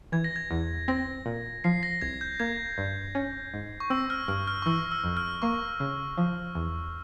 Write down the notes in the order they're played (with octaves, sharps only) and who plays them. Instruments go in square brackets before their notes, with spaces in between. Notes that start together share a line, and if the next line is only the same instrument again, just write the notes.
[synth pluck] E3 [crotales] G#6
[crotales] A#6
G#6
[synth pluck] E2
[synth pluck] C4 [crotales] A#6
[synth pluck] A#2
[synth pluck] F3 [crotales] C7
[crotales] A#6
[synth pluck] C2 [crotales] G#6
[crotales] G6
[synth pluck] A#3 [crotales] G#6
[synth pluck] G2
C#4
G#2
[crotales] C#6
[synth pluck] C4 [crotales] E6
[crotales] F6
[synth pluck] G2 [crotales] F6
[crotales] F6
C#6
[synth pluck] E3 [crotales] E6
[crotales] E6
[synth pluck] F2
[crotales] F6
[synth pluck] A#3 [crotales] C#6
[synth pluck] C#3
F3
E2